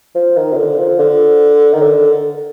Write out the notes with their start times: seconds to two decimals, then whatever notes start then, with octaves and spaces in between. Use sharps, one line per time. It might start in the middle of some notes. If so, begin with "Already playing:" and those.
0.15 F3
0.36 D#3
0.53 C3
0.57 D3
0.78 F3
0.99 D3
1.73 D#3
1.82 D3